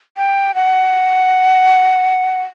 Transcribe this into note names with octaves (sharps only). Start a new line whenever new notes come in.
G5
F#5